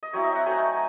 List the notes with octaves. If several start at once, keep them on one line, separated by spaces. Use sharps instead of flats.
D#5
F#3 C4 E4 C#5
E5
F#5
F#3 A3 C4 D#4 G#5